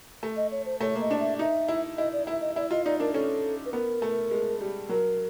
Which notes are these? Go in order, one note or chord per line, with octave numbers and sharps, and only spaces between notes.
A3
D#5
C#5
C5
A3 C#5
A#3
D#5
D4
E5
D#4 E5
E4
E4 D#5
D5
E4 E5
D#5
E4 D5
F4 D#5
D#4 D5
D4 A#4
C#4 A4
B4
B3 A#4
A3
G#3
G3
F#3 A#4